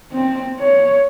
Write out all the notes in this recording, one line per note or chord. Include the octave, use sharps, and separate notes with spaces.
C4
C#5